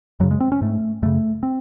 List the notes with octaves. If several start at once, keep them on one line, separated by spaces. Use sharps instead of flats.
F#2 C#3 F#3
G#3
C4
C#4
G#2 A3
F#2 C#3 A3
C4